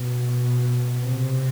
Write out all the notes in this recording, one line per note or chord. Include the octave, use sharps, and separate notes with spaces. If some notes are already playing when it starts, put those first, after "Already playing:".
Already playing: B2
C3